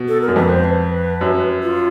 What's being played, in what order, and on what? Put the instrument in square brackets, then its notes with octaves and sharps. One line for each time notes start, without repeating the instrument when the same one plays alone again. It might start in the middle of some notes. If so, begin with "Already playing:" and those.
Already playing: [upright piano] B2
[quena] A4
A#4
[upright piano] F#2
[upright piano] F2 [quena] B4
[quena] C5
B4
[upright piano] F#2
[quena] F4